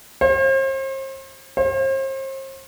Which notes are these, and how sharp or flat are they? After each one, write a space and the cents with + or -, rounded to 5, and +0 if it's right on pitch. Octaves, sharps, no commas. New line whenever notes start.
C5 +40
C5 +40